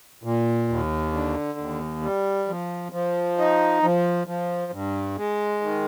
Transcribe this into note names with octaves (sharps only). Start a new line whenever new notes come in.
A#2
D#2
D3
D#2
G3
F3
F3
D#4
F3
F3
G2
G#3
D#3